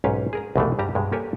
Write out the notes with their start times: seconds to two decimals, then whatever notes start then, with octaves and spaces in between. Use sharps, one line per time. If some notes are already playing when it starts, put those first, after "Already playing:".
0.04 B1 G#2 C#4 G4 B4 F5
0.33 G#4 A#4 A#5
0.56 C2 F2 B2 E3 G#3 A3
0.79 G2 G3 G4 A#5
0.95 G2 B2 G#3
1.12 A#3 G4 A4 A#4 C#5 G#5